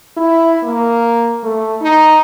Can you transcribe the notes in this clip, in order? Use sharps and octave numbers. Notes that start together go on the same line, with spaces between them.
E4
A#3
A3
D#4